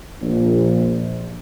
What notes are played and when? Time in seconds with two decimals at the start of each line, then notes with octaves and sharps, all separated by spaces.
0.22 A#1